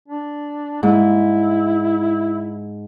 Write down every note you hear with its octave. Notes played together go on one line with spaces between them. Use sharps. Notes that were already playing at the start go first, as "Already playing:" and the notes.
D4
G#2 E4